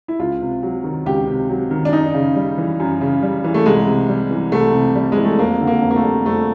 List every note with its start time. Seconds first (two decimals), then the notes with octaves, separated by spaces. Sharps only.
0.08 E4
0.19 C#2 F4
0.41 C3
0.63 F#3
0.84 D#3
1.06 C#2 G4
1.28 C3
1.49 F#3
1.71 D#3
1.85 D4
1.92 F#2 D#4
2.14 C#3
2.36 G3
2.58 E3
2.80 F#2
3.01 C#3
3.23 G3
3.44 E3
3.54 A3
3.66 C2 G#3
3.87 C3
4.09 G3
4.31 E3
4.52 C2 A3
4.74 C3
4.95 G3
5.12 E3 G#3
5.25 A3
5.39 F2 A#3
5.61 D3
5.67 A#3
5.82 F2
5.91 A#3
5.96 A3
6.04 G3
6.25 F2 A3